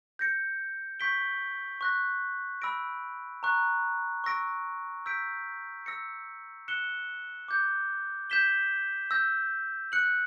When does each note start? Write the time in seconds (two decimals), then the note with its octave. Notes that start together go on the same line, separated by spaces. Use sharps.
0.19 G6 A#6 C#7
1.00 C#6 G6 B6 D7 G7
1.81 C#6 F#6 A#6
2.62 B5 E6 A#6 D7
3.43 A#5 C#6 F#6
4.24 C#6 E6 A#6 D7
5.06 E6 G6 B6 D7
5.86 E6 A#6 C#7
6.68 F#6 C#7 E7 G7
7.48 D6 G6 C#7
8.30 G6 B6 E7 G7
9.11 E6 G6 A#6
9.92 F#6 C#7 F#7